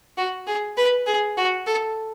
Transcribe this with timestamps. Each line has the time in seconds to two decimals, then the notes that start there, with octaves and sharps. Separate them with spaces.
0.17 F#4
0.47 G#4
0.77 B4
1.06 G#4
1.37 F#4
1.66 A4